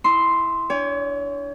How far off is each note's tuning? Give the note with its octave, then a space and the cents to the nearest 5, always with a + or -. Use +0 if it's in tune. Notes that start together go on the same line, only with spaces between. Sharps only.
E4 +0 C6 +0 D#6 +45
D4 -10 C#5 +30 G#5 -45